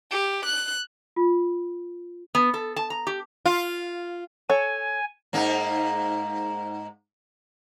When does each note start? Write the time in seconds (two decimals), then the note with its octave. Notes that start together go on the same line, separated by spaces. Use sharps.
0.12 G4
0.46 F#6
1.16 F4
2.35 B3
2.54 A4
2.76 A5
2.90 A#5
3.07 G4
3.46 F4
4.50 A4 C#5 G#5
5.33 G#2 A#3 D#4